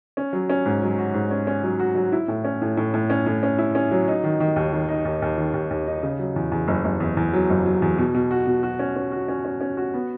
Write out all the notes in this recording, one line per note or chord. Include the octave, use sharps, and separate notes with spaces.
C#4
F#3
C#4
G#2
F#3
F#4
G#2
C#4
C#4
F#3
F#4
F#3
E4
A2
C#4
A2
A2
A2
C#4
A2
C#4
E4
C#4
F#3
D#4
D#3
D#3
D#2
D#3
D#4
D#2
D#2
D#3
D#2
D#2
D#4
C#3
F#3
E2
E2
F#1
F#1
E2
E2
F#3
F#1
F#3
E2
B2
B2
F#4
B2
F#4
C#4
C#4
F#4
C#4
C#4
C#4
F#4
B3